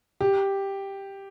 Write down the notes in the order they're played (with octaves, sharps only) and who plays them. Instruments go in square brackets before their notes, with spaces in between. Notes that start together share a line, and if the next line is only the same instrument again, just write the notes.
[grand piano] G4